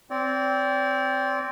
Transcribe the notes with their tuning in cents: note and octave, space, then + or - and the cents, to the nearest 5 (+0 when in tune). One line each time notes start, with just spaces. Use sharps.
C4 +0 D5 -35